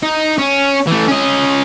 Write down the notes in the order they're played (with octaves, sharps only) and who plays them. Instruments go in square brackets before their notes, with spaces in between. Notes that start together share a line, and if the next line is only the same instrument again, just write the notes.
[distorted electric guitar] D#4
C#4
E3 A3
C#4 D#5